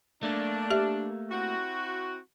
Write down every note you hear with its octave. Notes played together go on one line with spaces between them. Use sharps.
A3 A#3 D4
G4 E5
C4 E4 F#4